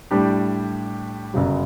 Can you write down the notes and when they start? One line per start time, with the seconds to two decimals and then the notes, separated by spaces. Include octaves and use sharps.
0.11 A2 G3 D4 G4
1.34 G1 F#2 C#3 F#3